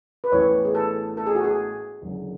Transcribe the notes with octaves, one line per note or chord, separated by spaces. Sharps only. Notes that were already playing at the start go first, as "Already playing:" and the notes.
B4
A1 A2 E3 B3 C#5
G#4
A4
A4
G#4
F#4
G#4
F#1 F#2 D3